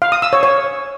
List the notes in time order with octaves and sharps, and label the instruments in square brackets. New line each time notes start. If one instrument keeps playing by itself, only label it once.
[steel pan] F5
D#6
E6
C#5
C#5